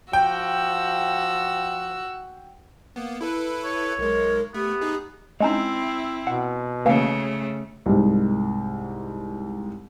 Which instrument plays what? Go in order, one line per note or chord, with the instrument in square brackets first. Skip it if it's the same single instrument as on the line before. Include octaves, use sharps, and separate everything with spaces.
[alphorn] F3 [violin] F#4 E6 [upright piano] G5
[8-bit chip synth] A#3 B3
E4 A4 B4
[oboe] C#5
[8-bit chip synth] B1 G#3 [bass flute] A#4
[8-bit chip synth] A3 [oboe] B3 [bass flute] G4
[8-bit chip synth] D#4 G#4
[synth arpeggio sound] G#3 C#4 D#4 [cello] C4 E4
[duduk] B2 [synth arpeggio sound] F#5
[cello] C#3 A3 [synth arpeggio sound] E3 A#3 C#4
[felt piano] C2 G#2